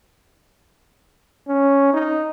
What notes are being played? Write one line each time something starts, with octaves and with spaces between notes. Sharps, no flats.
C#4
D#4